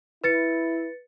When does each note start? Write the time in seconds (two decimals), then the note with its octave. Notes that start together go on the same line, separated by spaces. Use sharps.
0.24 E4 B4 A6 C#7